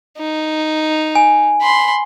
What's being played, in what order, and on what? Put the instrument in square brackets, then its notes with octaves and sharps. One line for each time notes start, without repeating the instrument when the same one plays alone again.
[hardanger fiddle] D#4
[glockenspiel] G#5
[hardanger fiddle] B5 C6